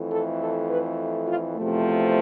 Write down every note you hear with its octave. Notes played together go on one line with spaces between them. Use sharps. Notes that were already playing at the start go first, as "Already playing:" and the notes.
Already playing: F2 E3 A3
A4
A4
B4
F4
E2 C3 F3 A3